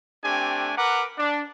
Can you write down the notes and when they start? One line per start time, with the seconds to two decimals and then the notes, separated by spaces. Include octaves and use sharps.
0.24 A3 C4 D4 G4 G#5
0.78 A#4 B4 F#5 A#5 D6
1.19 D4